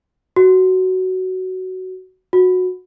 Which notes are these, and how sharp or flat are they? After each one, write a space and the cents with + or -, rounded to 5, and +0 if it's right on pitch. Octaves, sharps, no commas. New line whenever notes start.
F#4 +10
F#4 -15